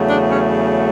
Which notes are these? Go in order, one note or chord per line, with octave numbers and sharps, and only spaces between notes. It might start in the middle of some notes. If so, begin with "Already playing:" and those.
Already playing: E2 C#3 F#3 A3
D4
C#4